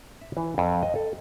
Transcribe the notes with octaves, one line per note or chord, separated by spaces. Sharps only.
E5
E3
F2
D#5
A4